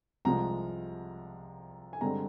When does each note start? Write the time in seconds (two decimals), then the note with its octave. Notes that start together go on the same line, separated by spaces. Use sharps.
0.25 C2 C3 F3 G#3 A#5
1.93 G#5
2.01 G2 D3 G#3 C4 A#5